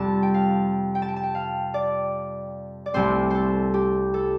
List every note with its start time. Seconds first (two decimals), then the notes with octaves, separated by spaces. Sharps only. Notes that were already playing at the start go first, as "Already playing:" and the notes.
Already playing: F2 C3 G3 A5
0.23 G5
0.34 F5
0.95 G5
1.02 A5
1.08 G5
1.16 A5
1.23 G5
1.35 F5
1.74 D5
2.86 D5
2.94 C2 C3 A3 C4 C5
3.30 A4 C5
3.74 G4
4.14 A4